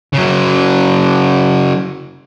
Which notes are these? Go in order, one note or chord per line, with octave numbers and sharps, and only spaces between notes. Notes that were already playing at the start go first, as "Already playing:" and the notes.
C#3 F#3